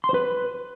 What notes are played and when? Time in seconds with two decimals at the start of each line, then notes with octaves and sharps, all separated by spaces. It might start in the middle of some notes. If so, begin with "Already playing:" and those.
0.04 C6
0.09 C5
0.14 B4